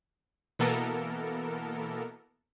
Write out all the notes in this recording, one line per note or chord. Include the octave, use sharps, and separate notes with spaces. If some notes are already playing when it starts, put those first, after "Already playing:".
B2 E3 A#3 B3 A4 A#4